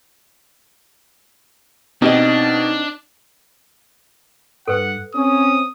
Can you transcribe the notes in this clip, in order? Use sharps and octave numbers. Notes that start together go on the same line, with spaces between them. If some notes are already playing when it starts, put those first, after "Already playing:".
B2 C4 D4 D#4 G4 D#5
G2 A4 B4 F#5
C4 C#4 D#6